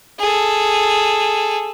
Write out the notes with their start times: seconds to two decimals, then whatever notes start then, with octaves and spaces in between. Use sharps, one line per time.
0.20 G#4 A4